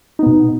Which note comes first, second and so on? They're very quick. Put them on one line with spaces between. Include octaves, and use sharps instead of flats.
D#4 B3 B2